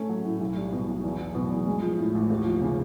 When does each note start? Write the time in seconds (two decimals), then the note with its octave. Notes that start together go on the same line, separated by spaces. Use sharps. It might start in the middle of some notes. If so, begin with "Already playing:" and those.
Already playing: A3 C#4
0.09 F#3
0.25 A2
0.41 B1
0.56 G3
0.72 B2
0.88 B1
1.04 E2
1.19 F#3
1.35 B2
1.50 E2
1.67 G#3
1.82 F3
1.99 A2
2.15 A1
2.30 D#2
2.45 F3
2.61 C#3